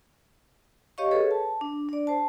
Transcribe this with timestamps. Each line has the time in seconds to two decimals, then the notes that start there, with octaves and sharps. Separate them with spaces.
0.98 G4 C#5 D#5 F5 C#6
1.11 G#4 A4 B4 C#5
1.31 A5
1.61 D4
1.89 D4 D5
2.07 C5 A5